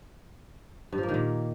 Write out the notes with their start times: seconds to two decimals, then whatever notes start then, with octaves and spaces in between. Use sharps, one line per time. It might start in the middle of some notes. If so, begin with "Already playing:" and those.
0.93 G2
0.98 F3
1.03 A#3
1.09 D#3
1.14 A#2